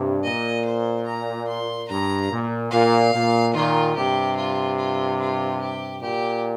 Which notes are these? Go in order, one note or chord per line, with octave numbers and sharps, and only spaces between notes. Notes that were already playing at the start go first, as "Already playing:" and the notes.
Already playing: G2 C3
A#2 D#5
C5
A#5
C6
G2 A#5
A#2
A#2 F5
A#2
A#2 D#3 F4
G2 C3 G4
F4
F4
F4
G4
A#2 G4